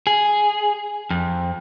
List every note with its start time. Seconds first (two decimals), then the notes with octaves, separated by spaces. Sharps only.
0.07 G#4
1.10 F2